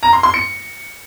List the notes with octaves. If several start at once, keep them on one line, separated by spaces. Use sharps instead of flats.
A#5
C6
C6
C#7